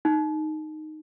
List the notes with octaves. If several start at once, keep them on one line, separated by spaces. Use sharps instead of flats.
D#4